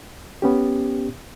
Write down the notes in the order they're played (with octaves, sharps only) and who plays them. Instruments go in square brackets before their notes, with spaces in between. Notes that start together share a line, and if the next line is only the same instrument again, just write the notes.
[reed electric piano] B3 C#4 G4